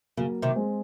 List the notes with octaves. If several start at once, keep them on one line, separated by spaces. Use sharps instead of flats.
C#3 F#3 A#3
C3 D#3
G#3 C4